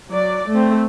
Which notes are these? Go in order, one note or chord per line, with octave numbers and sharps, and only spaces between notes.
F#3 D5
A3 C4